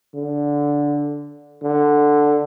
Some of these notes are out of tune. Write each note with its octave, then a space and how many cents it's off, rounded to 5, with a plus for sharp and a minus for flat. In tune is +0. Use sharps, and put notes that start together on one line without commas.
D3 -10
D3 +5